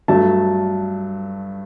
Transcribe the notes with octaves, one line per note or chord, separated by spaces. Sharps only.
G2 F#3 A3 A5